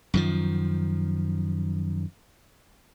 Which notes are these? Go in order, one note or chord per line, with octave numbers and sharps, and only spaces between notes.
F#2 D#3 F3